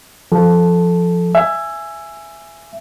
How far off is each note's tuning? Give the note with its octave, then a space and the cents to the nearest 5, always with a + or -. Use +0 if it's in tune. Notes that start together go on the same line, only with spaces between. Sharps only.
F3 -5 A4 -5
E5 +20 G#5 +0